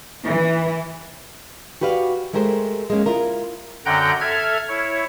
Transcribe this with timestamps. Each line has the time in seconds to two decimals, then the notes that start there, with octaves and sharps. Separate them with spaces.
0.25 E3
1.81 F#4 G4 B4 D5 F5
2.33 G#3 A3 G4 A#4 C5
2.90 G#3 A#3 C#4
3.06 E4 F4 A#4
3.85 F#2 D3 F#5 G5 A#5 G6
4.20 A4 E5 F6 G#6
4.68 E4 C#5